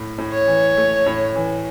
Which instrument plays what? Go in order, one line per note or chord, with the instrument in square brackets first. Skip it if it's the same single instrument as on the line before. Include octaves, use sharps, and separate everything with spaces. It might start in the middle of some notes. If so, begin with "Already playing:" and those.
Already playing: [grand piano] A2
A2
[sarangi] C#5
[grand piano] E3
A3
A2
E3